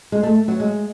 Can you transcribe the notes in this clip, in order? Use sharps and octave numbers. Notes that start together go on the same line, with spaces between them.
G#3
A3
F#3
G#3